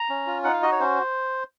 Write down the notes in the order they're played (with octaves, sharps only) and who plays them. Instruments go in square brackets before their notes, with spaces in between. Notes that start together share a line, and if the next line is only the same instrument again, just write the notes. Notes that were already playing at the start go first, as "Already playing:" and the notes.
Already playing: [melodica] A#5
C#4
F4
D#4 F#5
F5
F#4 D#5
C#5
C#4 C5